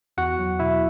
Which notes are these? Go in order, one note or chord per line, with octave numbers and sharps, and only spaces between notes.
E2 F#4 F#5
F#3
B2 E4 E5